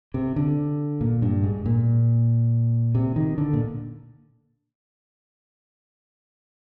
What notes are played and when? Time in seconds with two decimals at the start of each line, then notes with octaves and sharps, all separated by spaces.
0.14 C3
0.36 D3
1.01 A#2
1.22 G2
1.44 G#2
1.66 A#2
2.95 C3
3.16 D#3
3.38 D3
3.53 A#2